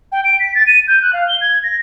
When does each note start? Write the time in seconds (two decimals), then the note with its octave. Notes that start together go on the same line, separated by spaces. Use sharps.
0.12 G5
0.25 D7
0.40 B6
0.55 A6
0.67 D#7
0.88 G6
1.02 F#6
1.13 F5
1.29 G7
1.41 G#6
1.63 A#6